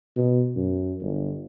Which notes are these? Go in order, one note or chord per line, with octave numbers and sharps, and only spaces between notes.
B2
F#2
G1